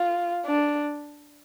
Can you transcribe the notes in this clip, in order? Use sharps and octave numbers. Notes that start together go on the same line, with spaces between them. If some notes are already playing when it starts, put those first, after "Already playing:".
Already playing: F4
D4